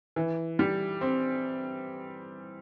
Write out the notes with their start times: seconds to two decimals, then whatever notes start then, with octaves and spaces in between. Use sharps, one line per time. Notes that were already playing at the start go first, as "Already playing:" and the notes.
0.16 E3
0.59 G3
1.01 C4